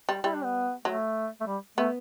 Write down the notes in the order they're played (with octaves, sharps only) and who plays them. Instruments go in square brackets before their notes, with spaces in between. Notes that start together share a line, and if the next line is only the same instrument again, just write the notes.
[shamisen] G3
[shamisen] G3 [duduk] E4
[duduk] D4
B3
[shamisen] F#3 [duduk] A3
[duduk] A3
G3
[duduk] A3 [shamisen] B3